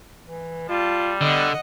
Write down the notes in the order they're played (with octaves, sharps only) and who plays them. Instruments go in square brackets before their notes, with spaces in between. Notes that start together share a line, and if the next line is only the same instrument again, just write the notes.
[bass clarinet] E3
[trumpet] G3 [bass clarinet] F4 [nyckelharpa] A5
[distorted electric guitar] D3 [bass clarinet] B3 [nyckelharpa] D#5 F#5